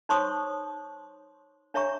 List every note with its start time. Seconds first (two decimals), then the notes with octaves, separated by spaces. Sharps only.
0.09 D#4 C5 C#5 C6 C#6 D#6
1.74 D4 C#5 E5 A#5 C#6